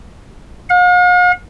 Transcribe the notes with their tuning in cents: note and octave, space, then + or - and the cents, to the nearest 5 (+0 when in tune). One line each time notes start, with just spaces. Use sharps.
F5 +45